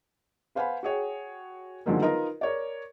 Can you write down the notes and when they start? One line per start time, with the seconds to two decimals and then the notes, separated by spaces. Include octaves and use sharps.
0.55 B4 C5 F5 F#5 G#5 B5
0.83 F#4 G#4 C#5 G5
1.86 D3 D#3 F3 F#3 G#3 A#3
2.02 D#4 F4 A#4 B4 D#5 A#5
2.41 A#4 C#5 D5